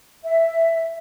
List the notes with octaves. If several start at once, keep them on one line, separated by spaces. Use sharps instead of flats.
E5